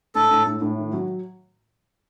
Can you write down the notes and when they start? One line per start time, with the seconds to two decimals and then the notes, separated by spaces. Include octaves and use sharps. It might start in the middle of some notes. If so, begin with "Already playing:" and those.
0.15 A2 A4
0.31 A2
0.46 A2
0.62 A2
0.78 D#3
0.93 F#3